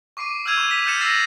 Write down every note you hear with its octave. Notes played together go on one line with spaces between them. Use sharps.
C#6 D6 C7 D7 D#7
E6 F6 G6 G#6 D#7 F7
C#6 G#6 E7
B6 F7 F#7
F6 G6 A6 C#7 E7
E6 A6 A#6 C7 F#7